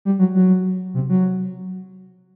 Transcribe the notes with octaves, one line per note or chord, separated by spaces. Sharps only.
G3
F#3
F#3
C3
F#3